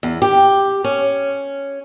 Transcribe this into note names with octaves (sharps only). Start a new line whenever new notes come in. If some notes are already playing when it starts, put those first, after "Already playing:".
E2
G4
C#4